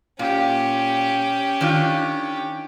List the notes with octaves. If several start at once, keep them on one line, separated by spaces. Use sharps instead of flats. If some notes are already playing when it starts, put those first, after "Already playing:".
A#2 C#4 G4
D#3 D4 F4